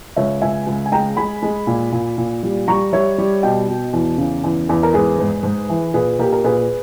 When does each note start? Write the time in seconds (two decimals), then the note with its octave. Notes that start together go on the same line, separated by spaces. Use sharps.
0.16 C#2 C#5 E5
0.42 C#2 E5 G#5
0.67 C#2
0.86 G#5
0.92 G#3 G5 A#5
1.17 G#3 G#5 B5
1.42 G#3
1.67 A#2
1.92 A#2
2.18 A#2
2.43 G3
2.68 G3 A#5 C#6
2.93 G3 C#5 E5
3.18 G3
3.42 B2 D#5 G5
3.68 B2
3.93 E2
4.18 C#3
4.44 E2
4.69 E2
4.83 A#4
4.94 G#2 G#4 B4
5.19 G#2
5.43 G#2
5.69 E3
5.94 A#2 G#4 B4
6.19 A#2 G4 A#4
6.32 A#4
6.44 A#2 G#4 B4